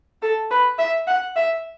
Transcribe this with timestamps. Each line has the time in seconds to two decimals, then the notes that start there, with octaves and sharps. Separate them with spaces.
0.22 A4
0.51 B4
0.79 E5
1.07 F#5
1.36 E5